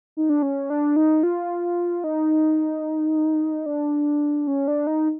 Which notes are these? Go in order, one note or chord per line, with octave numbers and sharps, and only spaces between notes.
D#4
D4
C#4
D4
D#4
F4
D#4
D4
C#4
D4
D#4